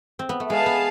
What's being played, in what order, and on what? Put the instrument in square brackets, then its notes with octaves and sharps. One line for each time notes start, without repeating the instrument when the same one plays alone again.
[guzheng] C4
B3
A3
[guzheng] G#3 [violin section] G#4 B4 F5 A5
[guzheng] B3